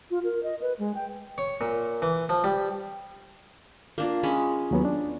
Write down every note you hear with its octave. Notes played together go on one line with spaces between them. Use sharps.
F4
A#4
D#5
B4
G#3
G5
C#5
A#2
E3
F3
G3
A#3 D4 F4
G#3 C#4 B5
D#2 F#3 B3
D4